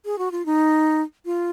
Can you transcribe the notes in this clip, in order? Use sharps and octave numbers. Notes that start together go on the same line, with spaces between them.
G#4
F#4
F4
D#4
F4